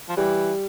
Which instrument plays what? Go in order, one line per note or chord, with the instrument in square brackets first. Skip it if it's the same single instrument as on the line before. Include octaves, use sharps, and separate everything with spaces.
[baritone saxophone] F3
[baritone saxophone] E3 [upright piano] G3